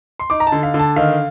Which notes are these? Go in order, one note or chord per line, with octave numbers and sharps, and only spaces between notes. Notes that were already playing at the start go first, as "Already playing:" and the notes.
C6
D#4 D6
A#5
A5
D3
F5
D3
A5
D#3 F5